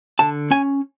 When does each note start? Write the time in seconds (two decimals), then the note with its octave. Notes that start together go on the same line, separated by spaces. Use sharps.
0.19 D3 A5
0.51 C#4 G#5